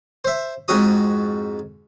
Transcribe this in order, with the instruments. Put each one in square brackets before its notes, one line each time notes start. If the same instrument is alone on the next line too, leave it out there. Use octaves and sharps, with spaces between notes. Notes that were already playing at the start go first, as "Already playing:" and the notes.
[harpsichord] C5 E5
F2 G#2 F#4 D#6